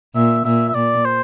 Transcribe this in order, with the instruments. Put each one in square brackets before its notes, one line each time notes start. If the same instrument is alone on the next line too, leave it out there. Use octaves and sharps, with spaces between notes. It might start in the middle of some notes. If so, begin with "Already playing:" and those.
[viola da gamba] A#2 [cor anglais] E5
[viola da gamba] A#2 [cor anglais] E5
[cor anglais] E5
[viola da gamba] A#2 [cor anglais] D5
[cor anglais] C5